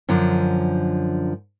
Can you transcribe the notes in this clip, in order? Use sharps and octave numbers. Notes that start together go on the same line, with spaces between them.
F#2 D3 F3